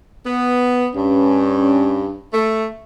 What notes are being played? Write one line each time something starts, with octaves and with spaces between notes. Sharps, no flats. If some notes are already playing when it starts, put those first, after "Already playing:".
B3
G2 C#4
A3